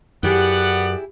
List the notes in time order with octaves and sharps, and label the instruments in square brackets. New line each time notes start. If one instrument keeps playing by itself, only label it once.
[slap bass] F#2 [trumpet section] B3 D5 F#5 [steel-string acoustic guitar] E4 G4 G#4